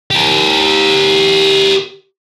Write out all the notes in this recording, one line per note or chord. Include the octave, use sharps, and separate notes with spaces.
G4 A#4